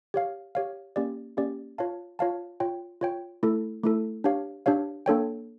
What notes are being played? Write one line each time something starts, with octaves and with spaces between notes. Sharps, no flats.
G4 C#5 F5
G4 C#5 F5
A#3 C#4 G4 D5
A#3 C#4 G4 D5
F4 C#5 F5 A5
F4 C#5 F5 A5
F4 C#5 G5
F4 C#5 G5
A3 E4 A4
A3 E4 A4
D4 G4 C#5 F5
D4 G4 C#5 F5
A#3 D4 A4 C#5 G5